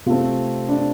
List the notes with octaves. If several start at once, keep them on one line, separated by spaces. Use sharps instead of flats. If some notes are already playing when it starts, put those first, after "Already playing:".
C3 A3 C4 F4
D4